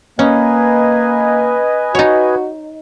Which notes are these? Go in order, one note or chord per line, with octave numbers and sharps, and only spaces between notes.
A#3 C#4 B4 D#5 G#5
D#4 F#4 C#5